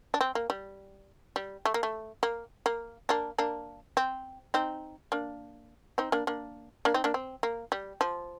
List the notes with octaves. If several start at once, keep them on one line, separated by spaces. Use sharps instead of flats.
D4
C4
A#3
G3
G3
A3
A#3
A3
A#3
A#3
A#3 D4
A#3 D4
C4
C4 D#4
A#3 D4
C4 D#4
A#3 D4
A#3 D4
A#3 D4
C4 D#4
A#3 D4
C4
A#3
G3
F3